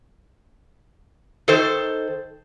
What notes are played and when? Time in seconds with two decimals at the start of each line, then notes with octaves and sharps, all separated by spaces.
1.48 D#3 A4 C5